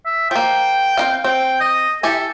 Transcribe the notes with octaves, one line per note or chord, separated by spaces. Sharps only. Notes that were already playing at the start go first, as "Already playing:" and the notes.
E5
F3 A#3 G5
C4 D#4 F5
C4 G5
D#5
E4 G4 A4 G#5